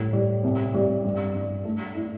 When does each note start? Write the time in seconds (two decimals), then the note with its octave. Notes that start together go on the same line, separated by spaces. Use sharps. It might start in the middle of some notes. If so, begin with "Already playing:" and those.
Already playing: A2 G3
0.13 G3
0.44 C2
0.74 G3
1.04 G2
1.35 G2
1.65 A3
1.95 E4